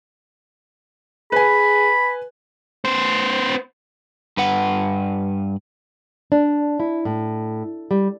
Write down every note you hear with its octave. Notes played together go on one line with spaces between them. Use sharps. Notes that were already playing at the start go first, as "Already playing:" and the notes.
G#4 B4 G#5 B5
B3 C5
G2 B4 F#5
D4
E4
A2
G3